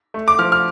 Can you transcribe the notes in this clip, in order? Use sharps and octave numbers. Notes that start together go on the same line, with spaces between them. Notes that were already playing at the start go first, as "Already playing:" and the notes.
A3
D6
F3 F6
F6